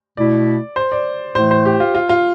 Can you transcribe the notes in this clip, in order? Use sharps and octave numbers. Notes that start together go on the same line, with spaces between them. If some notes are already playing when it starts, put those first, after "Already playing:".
B2 A3 E4 D5
C5
D5
A2 E3 A3 C5
C5
G4
F4
F4
F4